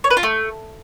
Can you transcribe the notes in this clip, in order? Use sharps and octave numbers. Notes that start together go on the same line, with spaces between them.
C#5
B4
F4
A3